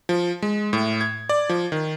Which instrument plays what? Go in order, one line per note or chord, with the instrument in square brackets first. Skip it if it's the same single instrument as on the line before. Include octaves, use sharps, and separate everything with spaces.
[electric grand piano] F3
G#3
A2
G#6
D5
F3
D#3